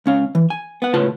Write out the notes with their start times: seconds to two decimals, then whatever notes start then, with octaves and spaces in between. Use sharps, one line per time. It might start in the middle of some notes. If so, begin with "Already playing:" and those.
0.06 C#2 C#4 F5
0.35 E3
0.50 G#5
0.82 B3 F#5
0.94 A2 C#3 F4 B4 A5 C6